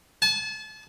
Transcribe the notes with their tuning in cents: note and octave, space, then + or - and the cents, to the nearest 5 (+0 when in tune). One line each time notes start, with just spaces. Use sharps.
A5 -35